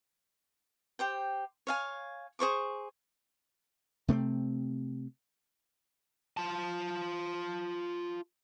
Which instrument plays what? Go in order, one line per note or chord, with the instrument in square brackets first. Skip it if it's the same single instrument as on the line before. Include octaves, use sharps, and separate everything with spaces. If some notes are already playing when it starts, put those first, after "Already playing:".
[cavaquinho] G4 C5 G5
C#5 F5 G#5
G#4 C5 C#6 D6
[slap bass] C3 A3 A#3 C4
[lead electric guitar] F4 A5